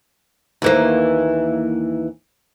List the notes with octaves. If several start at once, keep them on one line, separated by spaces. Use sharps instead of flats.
D#2 E3 A#3